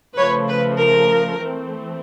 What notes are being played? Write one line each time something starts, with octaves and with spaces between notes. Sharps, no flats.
C#3 F3 A3 B4 C#5
B4
A#4
E3 A3 C4